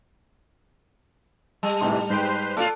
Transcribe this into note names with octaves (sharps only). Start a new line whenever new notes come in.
G3 A5
A2 C3 E3 D#4 C6
G#2 B4 C5 G5 C6
A2 F4 A4 D5 F#5